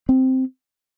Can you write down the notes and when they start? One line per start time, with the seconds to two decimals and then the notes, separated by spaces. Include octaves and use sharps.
0.09 C4